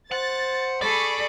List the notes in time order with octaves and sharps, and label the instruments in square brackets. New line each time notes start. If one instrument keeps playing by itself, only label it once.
[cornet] C5 [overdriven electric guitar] F#5 [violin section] A6
[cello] G#4 A4 [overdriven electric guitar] D5 [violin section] B5 C#6